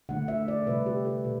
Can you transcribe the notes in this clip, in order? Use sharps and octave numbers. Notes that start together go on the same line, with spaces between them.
D3 A3 F#5
E5
D5
C3 G3 B4
G4
A4
B2 B4